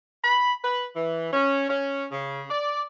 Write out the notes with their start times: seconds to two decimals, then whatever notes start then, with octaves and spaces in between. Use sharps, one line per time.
0.25 B5
0.64 B4
0.96 E3
1.33 C#4
1.69 C#4
2.12 C#3
2.50 D5